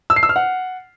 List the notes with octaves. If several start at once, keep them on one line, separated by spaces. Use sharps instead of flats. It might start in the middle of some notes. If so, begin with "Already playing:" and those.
E6
C7
E6
F6
F#5